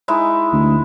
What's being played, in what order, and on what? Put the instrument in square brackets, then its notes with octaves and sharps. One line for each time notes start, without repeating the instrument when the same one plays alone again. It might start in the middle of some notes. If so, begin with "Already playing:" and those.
[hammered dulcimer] G#3 D#4 E4
[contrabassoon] D2